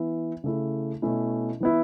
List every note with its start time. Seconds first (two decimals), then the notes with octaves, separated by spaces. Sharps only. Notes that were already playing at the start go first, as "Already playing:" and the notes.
Already playing: E3 B3 E4
0.44 C#3 A3 E4
1.02 B2 A3 C#4 E4
1.60 E3 B3 E4